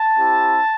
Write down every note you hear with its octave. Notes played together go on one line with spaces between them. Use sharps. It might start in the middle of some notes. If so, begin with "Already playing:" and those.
Already playing: A5
C4 E4 G4